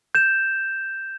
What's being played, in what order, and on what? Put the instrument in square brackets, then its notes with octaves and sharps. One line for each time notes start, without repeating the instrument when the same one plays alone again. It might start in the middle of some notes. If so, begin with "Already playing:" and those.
[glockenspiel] G6 E7